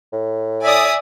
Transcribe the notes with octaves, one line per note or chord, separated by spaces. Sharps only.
A2
D5 E5 G#5 D#6